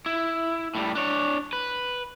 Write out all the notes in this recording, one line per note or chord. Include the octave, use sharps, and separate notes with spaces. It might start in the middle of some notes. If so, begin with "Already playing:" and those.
E4
A2 G3
D4 C#5
B4